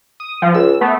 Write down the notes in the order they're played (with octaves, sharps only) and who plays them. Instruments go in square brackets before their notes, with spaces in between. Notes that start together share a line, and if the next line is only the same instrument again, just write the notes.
[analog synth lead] D#6
F3
[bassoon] C#2 [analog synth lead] E6
[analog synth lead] A3 [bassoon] B3